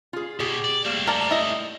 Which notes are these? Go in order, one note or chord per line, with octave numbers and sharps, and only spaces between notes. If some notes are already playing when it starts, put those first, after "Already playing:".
F4 G#4
B2 G4 G#4
D5
G3 A3 A#3 C4
A#4 D5 A5
E4 D#5